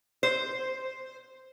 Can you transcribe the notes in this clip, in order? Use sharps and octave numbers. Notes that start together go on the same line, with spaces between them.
C5